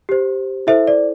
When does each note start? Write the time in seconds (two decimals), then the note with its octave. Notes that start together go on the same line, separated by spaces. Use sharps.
0.09 G4 C5
0.67 E4 A4 C5 E5
0.87 D5